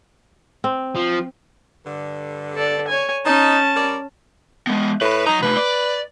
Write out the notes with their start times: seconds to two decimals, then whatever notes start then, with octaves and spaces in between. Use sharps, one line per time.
0.64 C4
0.96 F3
1.86 G2 D3
2.54 A4 D5
2.88 C#5 G#5
3.26 C#4 D#4 A5
3.76 G3 A#4 D5
4.67 G#3 B3
5.01 A2 B4 B5
5.26 F#3 D#4 A#5
5.42 C3 A3 B4
5.56 D5